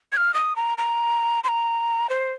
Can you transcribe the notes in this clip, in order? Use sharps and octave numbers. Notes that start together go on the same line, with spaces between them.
G#6
F6
D#6
A#5
A#5
C6
A#5
C5